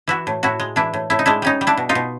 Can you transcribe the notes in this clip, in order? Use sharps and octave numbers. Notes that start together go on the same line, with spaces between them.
E3 E4 F#4
A2
A2 E4 F#4
G#3
E3 D4 E4
A2
A2 E4
D#4
G#3 D4 E4
G3 C#4 D#4
G3
D4 E4
B2
D#4 F4
B2